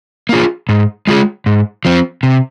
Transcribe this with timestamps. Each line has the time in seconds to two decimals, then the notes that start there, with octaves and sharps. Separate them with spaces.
0.29 A#3 F4 G#4
0.69 G#2
1.07 G#3 F4 G#4
1.46 G#2
1.85 F3 C4
2.23 C3